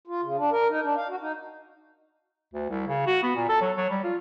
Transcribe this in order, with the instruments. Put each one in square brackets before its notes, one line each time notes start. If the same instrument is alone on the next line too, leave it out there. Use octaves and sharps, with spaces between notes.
[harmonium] F4
C#3
D4
A#4
D#4
D4
F5
F#4
D#4
[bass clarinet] D2
C2
C#3
F#4
B3
A#2
A4
F#3
F#3
G3
F4